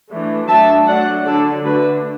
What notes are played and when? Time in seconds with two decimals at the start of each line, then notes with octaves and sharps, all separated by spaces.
0.10 E3 A3 D4
0.48 F#3 A3 D4 E5 A5
0.87 F#3 A3 D4 D5 F#5
1.26 D3 F#3 D4 A4 D5
1.65 D3 A3 D4 F#4 B4